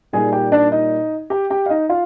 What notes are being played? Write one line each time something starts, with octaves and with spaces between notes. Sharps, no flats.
A#2 G3 A#3 D#4 G#4 G#5
G4 G5
D4 D5
D#4 D#5
G4 G5
G4 G5
F5
D#4 D#5
F4 F5